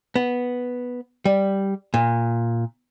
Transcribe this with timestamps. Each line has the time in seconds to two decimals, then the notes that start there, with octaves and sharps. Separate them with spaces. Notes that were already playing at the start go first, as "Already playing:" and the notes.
0.16 B3
1.25 G3
1.94 A#2